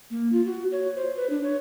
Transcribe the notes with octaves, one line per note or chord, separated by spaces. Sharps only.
A#3
F4
F#4
C#5
C5
B4
D4
C#5